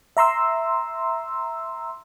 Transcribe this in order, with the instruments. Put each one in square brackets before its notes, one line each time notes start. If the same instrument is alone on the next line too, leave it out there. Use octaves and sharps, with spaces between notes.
[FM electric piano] E5 A#5 C6 E6